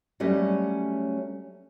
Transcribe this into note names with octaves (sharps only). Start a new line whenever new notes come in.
F#3 G3 A3 C#4